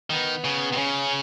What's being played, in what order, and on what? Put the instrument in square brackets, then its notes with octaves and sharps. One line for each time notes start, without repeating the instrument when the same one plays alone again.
[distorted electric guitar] D#3 [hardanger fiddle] B3
[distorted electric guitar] C#3
C3
[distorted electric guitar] C#3 [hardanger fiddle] C#4